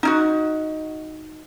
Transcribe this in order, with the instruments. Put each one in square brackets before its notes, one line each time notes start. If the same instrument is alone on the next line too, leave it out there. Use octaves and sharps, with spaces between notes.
[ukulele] D#4 E4 F#4